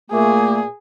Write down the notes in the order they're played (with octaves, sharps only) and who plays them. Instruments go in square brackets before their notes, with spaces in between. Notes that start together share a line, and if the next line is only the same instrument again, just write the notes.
[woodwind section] A#2 A3 A#3 [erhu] G#4